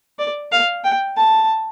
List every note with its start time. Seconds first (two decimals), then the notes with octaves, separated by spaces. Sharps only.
0.19 D5
0.52 F5
0.84 G5
1.17 A5